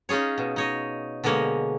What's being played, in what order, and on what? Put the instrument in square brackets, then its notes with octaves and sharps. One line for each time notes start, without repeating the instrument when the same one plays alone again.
[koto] C#4 D#4 F4 G#4 C#5
B2
D#4 C#5 D#5
B2 D3 G#3 A#3 C#5